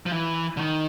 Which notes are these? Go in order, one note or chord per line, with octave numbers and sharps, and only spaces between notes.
F3
E3
D3
D#3